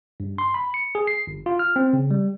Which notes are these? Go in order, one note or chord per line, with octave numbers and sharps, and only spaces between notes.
G2
C6
B5
C#7
G#4
C7
G1
F4
F6
C4
C#3
G3